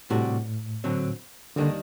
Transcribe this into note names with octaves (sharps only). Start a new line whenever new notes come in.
A2 C3 G3 D4 F#4
D3 F#3 C4
D#2 D3 D#3 G3 A#3 D4